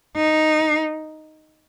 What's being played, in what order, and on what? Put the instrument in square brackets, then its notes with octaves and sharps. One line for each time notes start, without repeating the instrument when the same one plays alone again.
[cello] D#4